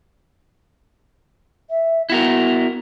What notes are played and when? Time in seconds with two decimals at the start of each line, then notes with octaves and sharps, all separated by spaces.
1.70 E5
2.10 B3 E4 F#4 A#4